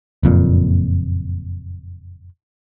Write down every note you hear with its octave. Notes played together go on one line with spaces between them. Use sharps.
F#1 F2 A#2